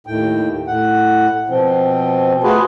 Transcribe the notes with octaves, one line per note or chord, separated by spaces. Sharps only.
D#2 A2 G5
A2 F#5
B2 F3 C4
A3 F4 F#4 G#4 B4